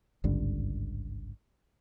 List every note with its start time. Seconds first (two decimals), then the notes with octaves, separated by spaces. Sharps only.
0.24 G#1 C#2 G2 D3